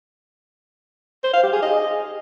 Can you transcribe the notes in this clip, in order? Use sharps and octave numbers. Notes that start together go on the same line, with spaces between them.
C5
F5
G4
G#4
D#5